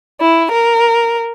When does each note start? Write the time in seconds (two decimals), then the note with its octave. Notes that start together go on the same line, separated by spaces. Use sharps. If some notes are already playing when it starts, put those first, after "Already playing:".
0.22 E4
0.52 A#4